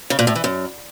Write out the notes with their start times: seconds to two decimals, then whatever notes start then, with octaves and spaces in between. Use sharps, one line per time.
0.10 C#3
0.19 A#2
0.27 A2
0.35 E3
0.44 F#2